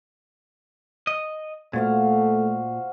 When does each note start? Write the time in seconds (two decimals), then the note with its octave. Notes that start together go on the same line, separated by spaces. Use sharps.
1.07 D#5
1.73 A#2 A3 F#4 C5 F5